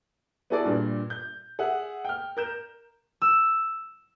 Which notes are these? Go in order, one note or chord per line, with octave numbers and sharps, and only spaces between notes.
B3 E4 F#4 G#4 A4 D5
G2 A#2
G6
G#4 E5 F#5
G5 F6
A#4 G6 E7
E6